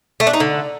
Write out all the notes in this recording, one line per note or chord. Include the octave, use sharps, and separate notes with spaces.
A3
D4
D#4
D3